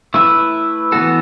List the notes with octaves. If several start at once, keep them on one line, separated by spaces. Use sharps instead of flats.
A3 E4 B4 E5
E3 B3 F#4 A4